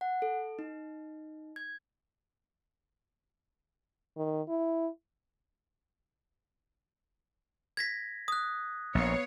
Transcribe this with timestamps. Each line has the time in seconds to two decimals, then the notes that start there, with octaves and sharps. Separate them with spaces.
0.01 F#5
0.22 A4
0.59 D#4
1.56 G#6
4.17 D#3
4.49 E4
7.77 G#6 A#6 B6
8.28 D#6 F#6
8.95 A#1 B3 C#5 F5